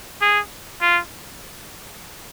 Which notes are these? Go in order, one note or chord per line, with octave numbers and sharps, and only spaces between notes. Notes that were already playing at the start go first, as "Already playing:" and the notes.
G#4
F4